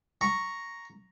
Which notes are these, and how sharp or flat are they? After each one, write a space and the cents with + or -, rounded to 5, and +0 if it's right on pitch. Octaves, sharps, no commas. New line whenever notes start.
A#5 +0 C#6 +0